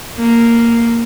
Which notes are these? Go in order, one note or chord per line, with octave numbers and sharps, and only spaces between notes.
A#3